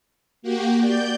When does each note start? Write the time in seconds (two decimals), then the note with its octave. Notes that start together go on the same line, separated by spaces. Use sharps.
0.42 A#3 F#4 G4
0.80 D5 G6